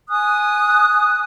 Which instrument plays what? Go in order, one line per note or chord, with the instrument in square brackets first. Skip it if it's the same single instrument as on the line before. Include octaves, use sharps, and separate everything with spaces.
[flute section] G#5 D#6 F#6